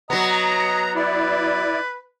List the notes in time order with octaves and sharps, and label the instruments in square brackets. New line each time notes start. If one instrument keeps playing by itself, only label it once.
[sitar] F#3 B3 [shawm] D#5 [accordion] A#5
[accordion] E4 D5 [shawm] B4